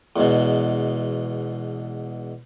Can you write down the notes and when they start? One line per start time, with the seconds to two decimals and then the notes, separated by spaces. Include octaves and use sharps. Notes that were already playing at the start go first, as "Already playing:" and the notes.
0.16 E2 G#2 B2